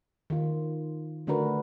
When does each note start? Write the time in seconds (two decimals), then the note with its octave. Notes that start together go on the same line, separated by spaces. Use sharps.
0.30 D#3 F4
1.27 D3 A3 D4 F#4 A#4 B4